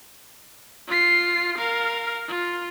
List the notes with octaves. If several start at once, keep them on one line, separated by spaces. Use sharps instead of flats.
F4 C7
A#4 F5
F4